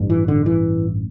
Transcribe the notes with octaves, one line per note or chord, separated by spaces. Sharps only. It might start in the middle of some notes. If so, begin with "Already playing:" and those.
Already playing: A1 G2
E3
D3
E3